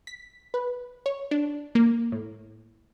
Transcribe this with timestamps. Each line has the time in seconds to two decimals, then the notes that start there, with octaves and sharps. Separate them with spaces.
0.07 B6
0.54 B4
1.06 C#5
1.31 D4
1.75 A#3
2.12 A2